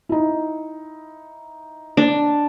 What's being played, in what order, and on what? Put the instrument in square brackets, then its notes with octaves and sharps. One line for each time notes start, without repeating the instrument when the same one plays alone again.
[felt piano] D#4 E4
[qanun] D4